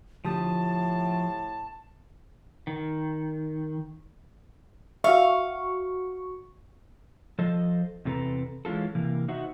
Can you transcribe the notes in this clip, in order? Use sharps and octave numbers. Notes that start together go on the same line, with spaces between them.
D2 A2 F3 G4 A5 D#6
D#3
F#4 E5 F5 C#6
F3 A4 C5 D#5
E2 C3 C4 A4 B4 A#5
E3 G#3 C#4 F4 A4
C3 E3 A#3
D#4 F#4 C5 E5 F#5